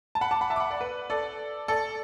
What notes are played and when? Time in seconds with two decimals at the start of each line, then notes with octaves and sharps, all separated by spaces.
0.15 A5
0.21 F#5 B5
0.31 A5 D6
0.41 F#5 B5
0.50 E5 A5
0.56 D6
0.60 F#5 B5
0.71 D5 F#5
0.81 B4
1.10 A4 D5
1.68 A4 D5